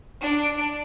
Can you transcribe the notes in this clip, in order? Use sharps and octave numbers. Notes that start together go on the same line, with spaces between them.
D4 D7